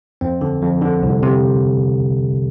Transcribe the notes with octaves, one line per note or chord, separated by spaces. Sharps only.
F2 C4
D3
F2
D3
C2
C3